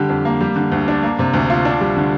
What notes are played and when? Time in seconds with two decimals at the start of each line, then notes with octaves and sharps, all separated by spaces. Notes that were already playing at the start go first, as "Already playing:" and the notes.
Already playing: D3 G3 G4
0.09 F2
0.25 A#3
0.41 G3
0.56 D3
0.72 D2
0.88 D4
1.03 A#3
1.19 C3
1.33 D2
1.50 F4
1.65 D4
1.81 G3
1.97 D3